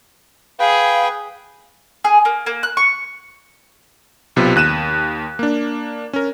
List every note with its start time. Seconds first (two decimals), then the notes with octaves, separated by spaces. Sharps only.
0.60 G#4 B4 F5 G5
2.05 G#4
2.25 A#3
2.46 A#3
2.63 F#6
2.77 C#6
4.36 B1 C3 B3 F4
4.56 D#2 F#6 D#7 E7
5.39 A#3 D4
6.13 C#4 A#4